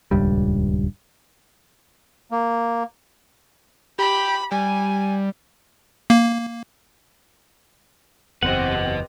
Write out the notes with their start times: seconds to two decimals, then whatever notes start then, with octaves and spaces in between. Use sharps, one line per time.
0.11 D#1 C#2 G2 G3
2.31 A#3
3.99 G4 B5
4.52 G3 G#5
6.10 A#3
8.43 F#1 E2 C4 G4 B4 D#5 F#5